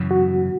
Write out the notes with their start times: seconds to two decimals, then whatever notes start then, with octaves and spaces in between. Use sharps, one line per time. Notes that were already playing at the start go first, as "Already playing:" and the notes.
Already playing: F#2 C#3 E3
0.11 F#4